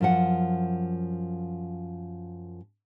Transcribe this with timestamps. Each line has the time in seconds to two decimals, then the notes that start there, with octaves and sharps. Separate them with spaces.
0.01 F#2 F3 F#5